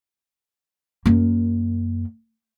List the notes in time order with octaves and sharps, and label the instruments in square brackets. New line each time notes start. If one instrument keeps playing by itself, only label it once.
[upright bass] F#2 A#3